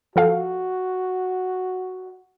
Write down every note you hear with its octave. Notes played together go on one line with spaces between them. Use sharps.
F3 F#4 A4 F5